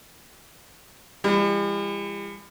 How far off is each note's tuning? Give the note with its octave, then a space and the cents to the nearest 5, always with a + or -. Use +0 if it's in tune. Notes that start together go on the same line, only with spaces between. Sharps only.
E3 +40 G3 +45